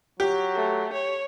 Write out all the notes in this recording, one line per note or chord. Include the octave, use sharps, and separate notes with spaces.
F#3 G4
A3
C#5